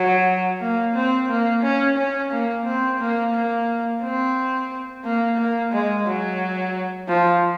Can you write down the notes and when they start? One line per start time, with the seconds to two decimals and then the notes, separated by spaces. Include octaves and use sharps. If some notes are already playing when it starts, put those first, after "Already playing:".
Already playing: F#3
0.60 A#3
0.95 C4
1.29 A#3
1.63 C#4
1.97 C#4
2.31 A#3
2.65 C4
2.99 A#3
3.33 A#3
4.02 C4
5.04 A#3
5.38 A#3
5.72 G#3
6.07 F#3
7.08 F3